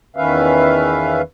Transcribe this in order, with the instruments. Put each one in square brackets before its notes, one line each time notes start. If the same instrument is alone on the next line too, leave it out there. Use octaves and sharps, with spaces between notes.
[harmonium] E2 D#3 C#4 B4 E5 F5